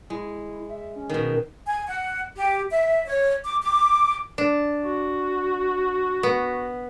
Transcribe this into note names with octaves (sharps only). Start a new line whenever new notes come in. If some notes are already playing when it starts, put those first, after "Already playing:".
G#3 E4
E5
C#4
B2 D#3
G#5
F#5
G4
E5
C#5
D6
D6
D4
F#4
B3